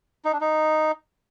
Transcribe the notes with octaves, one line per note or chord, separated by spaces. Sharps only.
D#4
D4
D#4